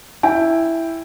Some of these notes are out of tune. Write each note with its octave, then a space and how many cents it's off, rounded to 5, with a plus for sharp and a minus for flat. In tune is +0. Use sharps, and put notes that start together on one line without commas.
E4 +0 G5 +5